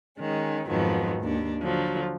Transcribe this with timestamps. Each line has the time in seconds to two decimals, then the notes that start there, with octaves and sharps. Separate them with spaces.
0.19 D#3 G#3 C#4
0.67 F2 G#2 D#3 F3 F#3 B3
1.20 D#2 D4
1.62 D3 F3 F#3